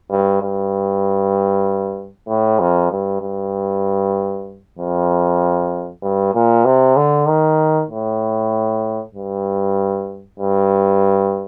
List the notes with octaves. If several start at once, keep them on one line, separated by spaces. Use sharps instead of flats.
G2
G2
A2
F2
G2
G2
F2
G2
A#2
C3
D3
D#3
A2
G2
G2